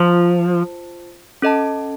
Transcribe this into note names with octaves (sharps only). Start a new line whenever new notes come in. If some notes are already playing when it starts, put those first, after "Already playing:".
Already playing: F3 F4 C5 A5
C#4 A4 D#5 A5